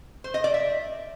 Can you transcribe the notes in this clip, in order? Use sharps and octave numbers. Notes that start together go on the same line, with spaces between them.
C5
D#5
D5
E5